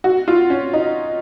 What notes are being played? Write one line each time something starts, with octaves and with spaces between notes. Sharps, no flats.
F#4
F4
C#4
D#4